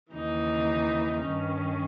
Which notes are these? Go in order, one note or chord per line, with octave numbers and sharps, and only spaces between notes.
D#2 C#3 E3 D#4
G2 D#3 C#4